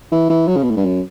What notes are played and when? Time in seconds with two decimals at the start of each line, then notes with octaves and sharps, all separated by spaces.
0.12 E3
0.30 E3
0.47 F#3
0.56 C#3
0.63 B2
0.70 A2
0.77 G2
0.84 F#2